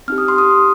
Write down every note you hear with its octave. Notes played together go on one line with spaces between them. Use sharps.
C4 D#4 G4 F6
D#6
C6
D#6